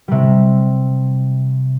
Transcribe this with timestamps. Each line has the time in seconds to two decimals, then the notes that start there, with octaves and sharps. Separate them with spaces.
0.08 C3 G3